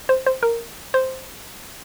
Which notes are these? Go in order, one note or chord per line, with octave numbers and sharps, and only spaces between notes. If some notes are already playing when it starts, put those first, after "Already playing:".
C5
C5
A#4
C5